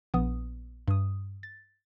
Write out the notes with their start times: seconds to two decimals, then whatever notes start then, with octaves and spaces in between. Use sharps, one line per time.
0.14 A#1 B3 D#6
0.88 G2 D#6
1.43 A6